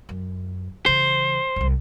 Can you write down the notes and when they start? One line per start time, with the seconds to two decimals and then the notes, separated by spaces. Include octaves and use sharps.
0.09 F#2
0.86 C#3 E3 C5
1.56 E1 C2